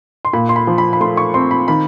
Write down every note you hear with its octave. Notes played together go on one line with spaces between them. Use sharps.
C6
A#2 B5
C6
B5
F3
B5
B5
A3 C6
C#6
C4 C6
B5
D#3 B5